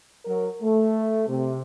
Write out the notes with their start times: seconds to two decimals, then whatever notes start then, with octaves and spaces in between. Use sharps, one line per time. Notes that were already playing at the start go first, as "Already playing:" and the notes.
0.25 F#3 A#4
0.61 A3
1.27 C3